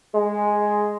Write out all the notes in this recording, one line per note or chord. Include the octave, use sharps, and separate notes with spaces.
G#3